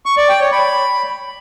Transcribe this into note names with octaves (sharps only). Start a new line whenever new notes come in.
C#6
D5
G5
C#5
B5